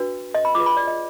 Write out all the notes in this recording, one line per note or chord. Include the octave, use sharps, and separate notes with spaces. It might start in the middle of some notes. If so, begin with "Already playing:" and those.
Already playing: D4 F#4 B4
D#5
B5
F4 G#4 B4 D6
B5
D5
D#5